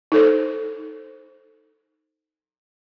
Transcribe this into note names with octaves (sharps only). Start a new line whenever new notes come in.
D#4 A4 C5